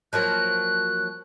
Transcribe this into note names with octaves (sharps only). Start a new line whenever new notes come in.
F3 F#3 A#3 F#6